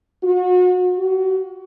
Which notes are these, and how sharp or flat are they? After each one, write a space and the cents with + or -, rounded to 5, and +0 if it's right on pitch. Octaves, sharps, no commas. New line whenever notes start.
F#4 -35
F#4 +35